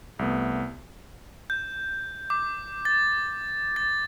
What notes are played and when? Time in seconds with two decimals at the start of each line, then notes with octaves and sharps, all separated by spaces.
0.19 C2 A3 B3
1.50 G6
2.30 D6
2.85 A6
3.76 A6